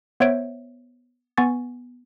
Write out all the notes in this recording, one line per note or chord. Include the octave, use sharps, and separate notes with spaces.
B3 C5 C#5 E5 G#6 D7
B3 G#5 C#6 A6